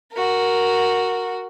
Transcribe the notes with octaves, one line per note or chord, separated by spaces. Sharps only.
F#4 A#4